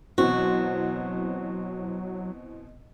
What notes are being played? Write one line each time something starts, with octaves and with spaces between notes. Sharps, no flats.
B2 E3 F#3 C4 F#4